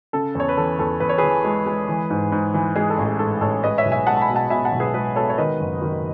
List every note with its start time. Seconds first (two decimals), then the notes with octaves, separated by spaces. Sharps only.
0.13 C#3 A4
0.35 E2 C#5
0.49 B4
0.57 E3 A4
0.79 E2 A4
1.00 E2 B4
1.09 C#5
1.18 E3 G#4 B4
1.44 G#3
1.66 G#3
1.88 E3
2.10 G#2
2.32 G#2
2.54 E3
2.75 G#3 G#4
2.90 A4
2.98 A1
3.05 G#4
3.19 G#2 A4
3.41 A1 A4 C#5
3.63 G#3 B4 D#5
3.78 C#5 E5
3.85 B1
3.92 E5 G#5
4.06 G#3 F#5 A5
4.17 A5
4.21 G#5 B5
4.29 B2
4.36 F#5 A5
4.50 B2 E5 G#5
4.65 F#5 A5
4.72 B1
4.80 G#4 B4
4.94 G#3 G#4 B4
5.16 B2 A4 C#5
5.30 C#5
5.38 D#3 B4 D#5
5.60 F#1
5.82 D#3